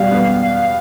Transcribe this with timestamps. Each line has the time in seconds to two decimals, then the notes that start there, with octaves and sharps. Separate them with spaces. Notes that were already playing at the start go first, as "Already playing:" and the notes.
Already playing: B2 G3 F5
0.11 B3